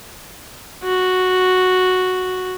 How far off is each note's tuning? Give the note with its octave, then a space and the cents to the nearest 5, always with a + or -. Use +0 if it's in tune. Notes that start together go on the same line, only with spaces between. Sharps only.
F#4 -5